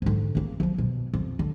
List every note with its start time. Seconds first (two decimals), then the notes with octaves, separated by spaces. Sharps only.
0.02 G#2 D3
0.35 C#3 A#3
0.60 F3 F#3
0.78 B2
1.13 F2
1.39 D3